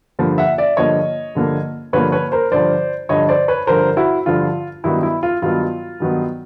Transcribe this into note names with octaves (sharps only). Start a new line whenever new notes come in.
G2 D3 F3 A#3
E5 F#5
D5 E5
G2 D3 F3 A#3 C#5 D#5
G2 D3 F3 A#3
G2 D3 F3 A#3 B4 C#5
B4 C#5
A#4 C5
G2 D3 F3 C5 D5
G2 D3 F3 C#5 D#5
C5 D5
B4 C#5
G2 D3 F3 A#4 C5
E4 F#4
G2 D3 F3 F4
G2 D#3 F#3 B3 E4
E4
F4
G2 D#3 F#3 B3 F4
G2 D#3 F#3 B3